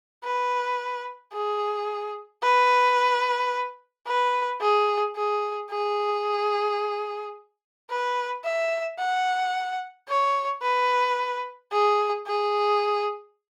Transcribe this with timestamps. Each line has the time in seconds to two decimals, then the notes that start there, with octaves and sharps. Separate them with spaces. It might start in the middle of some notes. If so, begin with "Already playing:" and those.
0.24 B4
1.33 G#4
2.43 B4
4.07 B4
4.61 G#4
5.16 G#4
5.71 G#4
7.90 B4
8.44 E5
8.99 F#5
10.08 C#5
10.63 B4
11.72 G#4
12.27 G#4